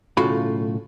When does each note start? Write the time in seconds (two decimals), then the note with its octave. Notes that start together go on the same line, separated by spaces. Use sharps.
0.17 B1 A2 C#3 F4 F#4 B5